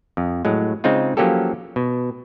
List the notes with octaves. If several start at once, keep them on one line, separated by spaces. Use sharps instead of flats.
F2
A2 F#3 G#3
C#3 G#3 C4 D#4 F4
F3 F#3 A#3 C#4 G4 A4
B2